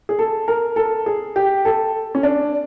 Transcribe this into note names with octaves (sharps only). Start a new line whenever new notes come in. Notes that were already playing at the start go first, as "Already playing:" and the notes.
G#4
A4
A#4
A4
G#4
G4
A4
C#4
D4